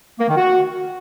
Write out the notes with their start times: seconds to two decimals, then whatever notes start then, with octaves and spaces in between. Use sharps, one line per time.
0.19 A#3
0.28 D#3
0.37 F#4